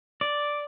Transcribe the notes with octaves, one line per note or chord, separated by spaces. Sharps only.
D5